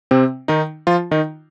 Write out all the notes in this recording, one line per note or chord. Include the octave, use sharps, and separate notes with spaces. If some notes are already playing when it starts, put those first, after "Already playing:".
C3 C4
D#3 D#4
F3 F4
D#3 D#4